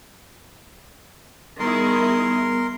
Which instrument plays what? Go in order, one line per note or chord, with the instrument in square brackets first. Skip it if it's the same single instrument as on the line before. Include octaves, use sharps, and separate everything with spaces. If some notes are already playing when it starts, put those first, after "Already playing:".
[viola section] D#3 E4 G#4 [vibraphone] G3 B3 [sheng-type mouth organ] A#4 C6